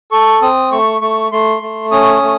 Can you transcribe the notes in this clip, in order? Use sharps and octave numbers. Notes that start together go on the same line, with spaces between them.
A4 C#6
C4 D#6
A3 C#6
A3 C#6
A3 C6
A3
C#4 D#6
A3